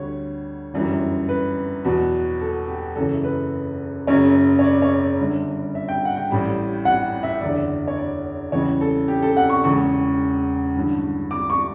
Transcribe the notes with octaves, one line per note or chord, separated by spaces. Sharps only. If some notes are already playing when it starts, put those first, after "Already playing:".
Already playing: D2 D3 G3 C#5
G1 F#2 E3 G3
B4
E2 B2 F#3
A4
G4
F#1 F#2 C#3 E3 A4
B4
F#1 F#2 C#3 C#5
C#5
D5
C#5
D5
G1 G2 D3
E5
G5
F#5
G5
A1 A2 G3
F#5
E5
F#1 E2 D3 D5
C#5
D5
E2 C#3 E3 G3 C#5
A4
G4
A4
F#5
C#6
E1 E2 C#3 C#6
A1 G2 D3
D6
C#6